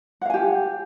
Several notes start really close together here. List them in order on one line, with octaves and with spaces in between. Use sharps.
F#5 F5 G#5 G4